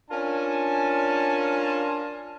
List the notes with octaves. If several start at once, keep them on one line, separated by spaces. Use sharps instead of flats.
C#4 D4 F4 A#4 G#5 A5